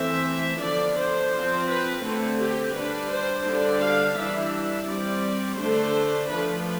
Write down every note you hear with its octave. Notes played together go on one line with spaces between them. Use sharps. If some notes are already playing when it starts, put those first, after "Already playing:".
Already playing: E3 A3 C4 E5
D3 F3 B3 D4 D5
C5
F3 C4
B4
D3 A3 C4 A4
G4
G3 D4 B4
C5
D3 G3 D4
F5
E3 G3 D4 E5
G3 C4 D5
D3 A3 D4 C5
F3 A3 D4 B4